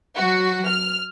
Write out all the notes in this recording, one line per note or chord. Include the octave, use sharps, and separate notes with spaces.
F#3 F#4
F6